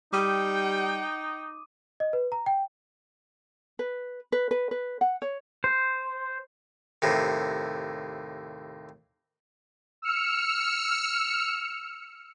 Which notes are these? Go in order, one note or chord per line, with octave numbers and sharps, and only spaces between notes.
G3 D#4 G5 D6 D#6 D#7
D#5
B4
A#5
G5
B4
B4
B4
B4
F#5
C#5
C5
D#2 A2 C3
E6 F6 C#7